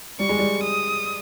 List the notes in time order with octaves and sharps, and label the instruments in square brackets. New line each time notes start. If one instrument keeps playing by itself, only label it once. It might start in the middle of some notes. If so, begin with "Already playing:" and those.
[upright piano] G3 [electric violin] C#6
[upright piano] G#3
G3
[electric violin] D#6